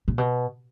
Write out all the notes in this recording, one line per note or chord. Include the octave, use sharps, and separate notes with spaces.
A#2
B2